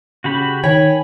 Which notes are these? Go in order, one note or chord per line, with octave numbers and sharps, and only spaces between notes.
C#3 F#4 G4 B5
D#3 C#5 G5 G#5 B5